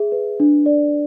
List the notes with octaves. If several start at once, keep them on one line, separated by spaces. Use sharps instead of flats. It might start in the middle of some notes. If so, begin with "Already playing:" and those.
Already playing: G#4 E5
B4
D4
D5